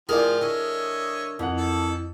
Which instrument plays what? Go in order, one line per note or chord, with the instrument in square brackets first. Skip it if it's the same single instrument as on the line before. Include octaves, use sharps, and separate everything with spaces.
[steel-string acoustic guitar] A2 D3 F4 [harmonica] F3 G4 [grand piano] G#4 D5 [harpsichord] A#4
[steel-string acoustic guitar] D3 G3 [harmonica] C#5 D#5 E5
[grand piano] F2 F#5 [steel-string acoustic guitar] E3 D#4
[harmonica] A4